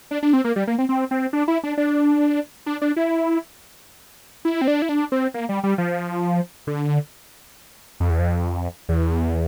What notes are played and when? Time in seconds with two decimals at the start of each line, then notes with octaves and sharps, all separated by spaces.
0.11 D4
0.23 D4
0.33 C4
0.44 A#3
0.56 G3
0.67 A#3
0.78 C4
0.89 C4
1.11 C4
1.33 D4
1.48 E4
1.64 D4
1.78 D4
2.66 D4
2.82 D4
2.96 E4
4.45 E4
4.61 C4
4.68 D4
4.82 E4
4.89 D4
5.12 C4
5.34 A#3
5.49 G3
5.64 G3
5.78 F3
6.67 D3
8.00 F2
8.10 E2
8.19 F2
8.89 E2